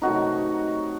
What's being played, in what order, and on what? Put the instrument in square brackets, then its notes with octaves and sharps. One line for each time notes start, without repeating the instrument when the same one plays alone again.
[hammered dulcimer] C3 D#3 F#3 A3 D#4 F#4